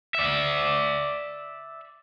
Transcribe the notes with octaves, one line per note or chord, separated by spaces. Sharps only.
D5 E5